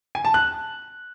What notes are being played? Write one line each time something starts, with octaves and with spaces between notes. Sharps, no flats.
G#5
A5
F#6